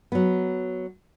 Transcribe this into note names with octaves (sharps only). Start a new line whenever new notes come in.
F#3 B3